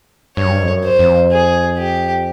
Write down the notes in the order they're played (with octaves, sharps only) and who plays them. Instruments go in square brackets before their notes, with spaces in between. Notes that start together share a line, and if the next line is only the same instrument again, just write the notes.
[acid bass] G2 [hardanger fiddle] C#5
[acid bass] F#2
G2
F2
F#2
[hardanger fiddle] C5
[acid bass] F2
[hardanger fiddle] G#4
G4